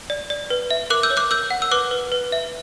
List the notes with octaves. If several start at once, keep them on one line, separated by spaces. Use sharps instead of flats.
D5
D5
B4
E5
A#4 D6 F#6
E6 G6
C#5
D6 F#6
A#4 E6 G6
F#5
E6
B4 D6 F#6
B4
B4
E5